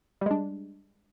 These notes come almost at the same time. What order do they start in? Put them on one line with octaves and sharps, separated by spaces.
G3 G#3 D4